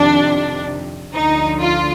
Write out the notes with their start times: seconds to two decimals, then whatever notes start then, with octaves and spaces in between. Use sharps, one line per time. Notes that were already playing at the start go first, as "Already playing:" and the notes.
Already playing: F2 C3 D#3 D4
1.13 D2 D3 F3 D#4
1.60 F4